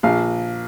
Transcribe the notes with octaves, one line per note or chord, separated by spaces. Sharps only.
A#1 F5